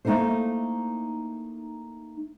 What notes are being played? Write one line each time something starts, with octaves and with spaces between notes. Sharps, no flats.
A3 A#3 D#4 E4 A4 C5